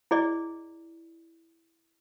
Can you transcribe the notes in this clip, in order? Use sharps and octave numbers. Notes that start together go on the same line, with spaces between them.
E4 G#4 D5 D#5